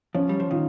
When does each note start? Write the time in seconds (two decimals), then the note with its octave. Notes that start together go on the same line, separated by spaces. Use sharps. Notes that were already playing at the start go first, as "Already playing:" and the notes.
0.15 F3 C#4
0.29 G3
0.40 F3
0.51 D#3 F4